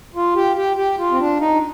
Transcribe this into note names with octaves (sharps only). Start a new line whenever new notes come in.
F4
G4
G4
G4
F4
C4
D4
D#4